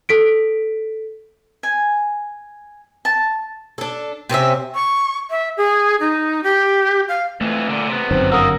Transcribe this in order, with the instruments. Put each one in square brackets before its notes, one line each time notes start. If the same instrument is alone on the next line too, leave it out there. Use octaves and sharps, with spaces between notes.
[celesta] A4 B6 D7
[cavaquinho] G#5
A5
[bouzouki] D4 A4
C3 C4 C#4 E5
[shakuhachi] C#6
E5
G#4
D#4
G4
F5
[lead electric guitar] F2 E3 [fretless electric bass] A3
[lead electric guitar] A#2 D3
C3 B3
[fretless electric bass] G1 F#2 D#3 [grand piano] C4
[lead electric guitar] A#3 [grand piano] A#4 F#5 [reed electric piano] D#6 E6